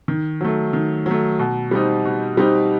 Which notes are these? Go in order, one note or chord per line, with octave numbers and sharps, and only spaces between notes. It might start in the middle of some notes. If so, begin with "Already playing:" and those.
D#3
F#3 A3
D#3
F#3 A3
B2
G3 C4 D#4
B2
G3 C4 D#4